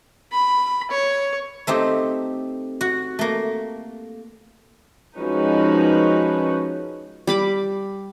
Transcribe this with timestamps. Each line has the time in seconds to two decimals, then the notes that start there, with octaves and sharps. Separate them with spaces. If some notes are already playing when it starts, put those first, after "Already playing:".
0.32 B5
0.91 C#5
1.67 A3 C4 D#4 G4
2.81 F#4
3.19 A3 A#3
5.17 F3 G#3 C#4 D#4 F#4 B4
7.27 G3 B5 D6